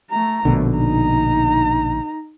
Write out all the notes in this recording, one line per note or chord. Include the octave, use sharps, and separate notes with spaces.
A3 A#5
A#1 B2 D3 A3
D#4 A#5